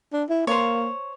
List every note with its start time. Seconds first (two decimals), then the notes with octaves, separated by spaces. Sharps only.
0.13 D4
0.29 E4
0.47 A#3 C5 C#5